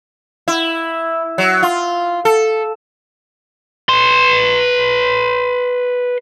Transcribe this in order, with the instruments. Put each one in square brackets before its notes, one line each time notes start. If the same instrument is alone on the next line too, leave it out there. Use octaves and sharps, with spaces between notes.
[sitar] E4
F#3
F4
A4
[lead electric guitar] B4 C6